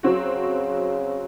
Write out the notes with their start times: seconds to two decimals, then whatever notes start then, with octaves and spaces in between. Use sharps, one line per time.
0.03 C#3 F#3 C4 F#4